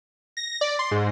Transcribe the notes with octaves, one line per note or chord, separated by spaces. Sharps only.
A#6
D5
C6
G#2